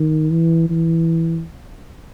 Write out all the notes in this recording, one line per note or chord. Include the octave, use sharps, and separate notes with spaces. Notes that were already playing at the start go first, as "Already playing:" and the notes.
Already playing: D#3
E3
E3